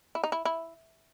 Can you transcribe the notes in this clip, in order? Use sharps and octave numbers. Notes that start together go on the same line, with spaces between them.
E4
D#4
E4
E4